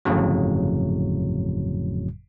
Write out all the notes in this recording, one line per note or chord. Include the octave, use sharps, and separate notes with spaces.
G1 F2 A2 C#3 F#3